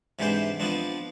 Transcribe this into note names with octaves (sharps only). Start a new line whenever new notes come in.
G#2 C3 E3 D4 C5 G5
F3 B3 C4 D4